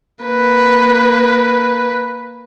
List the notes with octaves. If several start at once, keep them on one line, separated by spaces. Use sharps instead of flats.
A#3 B4